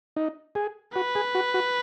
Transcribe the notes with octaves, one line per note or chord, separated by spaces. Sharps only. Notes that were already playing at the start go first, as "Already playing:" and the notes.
D#4
G#4
F#4 B4
G#4
F#4
F#4